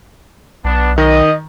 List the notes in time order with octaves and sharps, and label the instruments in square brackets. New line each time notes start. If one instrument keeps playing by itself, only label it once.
[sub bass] B1 [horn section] B3 D4
[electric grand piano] D#3 [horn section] D#5